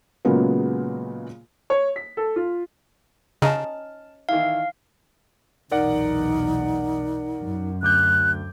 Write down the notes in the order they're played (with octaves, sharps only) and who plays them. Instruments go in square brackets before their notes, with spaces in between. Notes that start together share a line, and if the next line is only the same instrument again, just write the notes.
[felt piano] A#2 C#3 F#3 G#3 A#3 B3
[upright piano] C#5
B6
A4
F4
[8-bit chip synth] C#3 [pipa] C#4 D#4 [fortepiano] A5 F6
[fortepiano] D#3 E3 E4 [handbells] F5
[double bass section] B1 E2 A#2 [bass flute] D#4 [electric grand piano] A#4 D5 F#5
[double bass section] F#2
[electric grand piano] D2 D6 G6 [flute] F#6